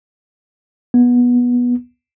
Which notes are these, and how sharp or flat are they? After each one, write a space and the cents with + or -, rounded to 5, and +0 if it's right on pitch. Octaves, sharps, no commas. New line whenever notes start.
B3 -15